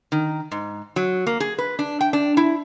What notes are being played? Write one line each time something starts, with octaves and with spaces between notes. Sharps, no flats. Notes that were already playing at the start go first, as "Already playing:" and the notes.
D#3
G#2
F#3
A#3
G#4
B4
D4
G5
D4
E4